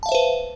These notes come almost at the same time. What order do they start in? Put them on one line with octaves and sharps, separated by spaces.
A5 F5 E5 C5 B4